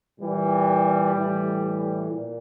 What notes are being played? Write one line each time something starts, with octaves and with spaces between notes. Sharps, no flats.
A#2 E3 G3
A2 E3
A#2